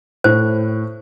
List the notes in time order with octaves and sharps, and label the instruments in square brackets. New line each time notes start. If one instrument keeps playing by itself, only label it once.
[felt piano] A2 [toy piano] C5